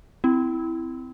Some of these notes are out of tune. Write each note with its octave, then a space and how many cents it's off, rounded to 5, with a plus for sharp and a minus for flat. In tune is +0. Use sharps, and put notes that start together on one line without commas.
C4 -20 E4 +0